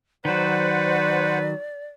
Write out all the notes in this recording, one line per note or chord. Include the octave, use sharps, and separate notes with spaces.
D#3 F#3 B4 C5 D5 F#5